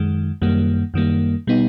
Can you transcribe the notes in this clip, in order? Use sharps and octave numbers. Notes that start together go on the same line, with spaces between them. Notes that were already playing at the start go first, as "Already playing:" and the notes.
Already playing: F#2 D#3 G#3
F#2 D#3 G3 A#3
F#2 D#3 G3 A#3
B2 G3 B3 D#4